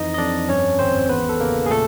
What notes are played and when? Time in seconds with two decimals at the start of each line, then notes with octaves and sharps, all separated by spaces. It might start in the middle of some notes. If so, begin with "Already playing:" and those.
Already playing: F2 E3 D#4 D#5
0.14 D#5
0.18 F2 D4 D5
0.49 G2 C#4 C#5
0.79 G#1 C4 C5
1.09 E2 B3 B4
1.29 A4
1.40 C#3 A#3 A#4
1.66 G#4
1.70 A#2 A3 A4